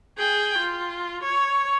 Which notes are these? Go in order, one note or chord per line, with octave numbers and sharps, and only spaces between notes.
G#4 G5
F4
C#5